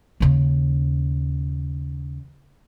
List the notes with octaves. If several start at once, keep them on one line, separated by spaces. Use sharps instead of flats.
D#2 C#3